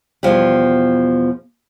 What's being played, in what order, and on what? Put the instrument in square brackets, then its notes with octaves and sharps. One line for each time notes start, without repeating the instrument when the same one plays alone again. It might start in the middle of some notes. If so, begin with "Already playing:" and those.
[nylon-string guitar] E2 B2 F3 G3